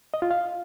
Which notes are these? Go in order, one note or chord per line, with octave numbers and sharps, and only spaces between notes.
D#5
F4
F5